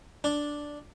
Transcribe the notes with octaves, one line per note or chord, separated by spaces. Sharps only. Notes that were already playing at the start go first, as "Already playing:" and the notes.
D4